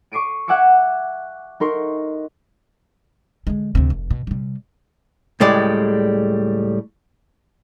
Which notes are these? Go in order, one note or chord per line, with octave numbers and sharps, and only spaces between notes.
C#6 D6 C7 D7 D#7
E5 F#5 G#5 D6 E6 C#7
D#4 A#4 C6 C#6
D3 G#3
D2 C3
F1
B2
C3 G3
C#2 A2 G3 G#3 D5